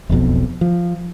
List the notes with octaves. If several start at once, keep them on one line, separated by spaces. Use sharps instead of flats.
E1 B1 F2 B2
F3